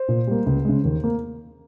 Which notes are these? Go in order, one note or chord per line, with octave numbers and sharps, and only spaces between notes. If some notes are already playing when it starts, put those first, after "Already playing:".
Already playing: C5
A#2
G3 A#3
C#2
C#3 G#3
D#2
A#3